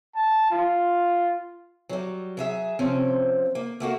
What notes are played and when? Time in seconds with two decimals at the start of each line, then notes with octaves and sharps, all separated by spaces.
0.15 A5
0.51 F4
1.89 F#3 G3
2.37 F#3 G#4 E5
2.79 C3 F3 C4 C#4
3.55 A#3
3.80 A3 A#3 F#4